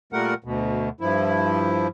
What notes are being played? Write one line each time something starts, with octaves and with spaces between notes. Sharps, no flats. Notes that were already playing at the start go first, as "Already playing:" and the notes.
A#2 G3 A3 A#4 F#5
D2 B2
G2 F3 E4